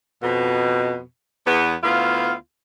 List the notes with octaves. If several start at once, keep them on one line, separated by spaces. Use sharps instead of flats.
F2 B2
E2 B3
D2 B3 E4 F4 F5